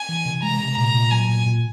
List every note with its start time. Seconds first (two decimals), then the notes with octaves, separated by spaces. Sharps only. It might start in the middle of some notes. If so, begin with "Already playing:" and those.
Already playing: G#5
0.09 E3
0.25 C3
0.43 G#3 A#5
0.60 C3
0.77 A#2 A#5
0.95 A#2
1.11 F#3 G#5
1.29 A#2
1.46 A#2